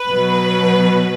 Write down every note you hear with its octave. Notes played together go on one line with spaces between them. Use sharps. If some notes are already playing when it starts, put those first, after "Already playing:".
Already playing: B4
B2 F#3